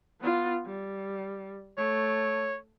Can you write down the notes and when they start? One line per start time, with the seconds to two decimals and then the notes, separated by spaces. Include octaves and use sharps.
0.20 B3 F4
0.66 G3
1.78 A3 C#5